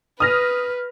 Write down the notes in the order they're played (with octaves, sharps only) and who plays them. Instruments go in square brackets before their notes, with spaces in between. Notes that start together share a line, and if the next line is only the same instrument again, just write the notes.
[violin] B4 [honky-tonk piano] D#6 F6 A#6